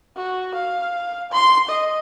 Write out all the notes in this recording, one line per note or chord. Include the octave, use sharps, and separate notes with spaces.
F#4
F5
C6
D#5